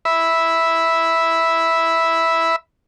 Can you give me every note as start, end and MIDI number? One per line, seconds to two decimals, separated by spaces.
0.05 2.56 76
0.05 2.56 83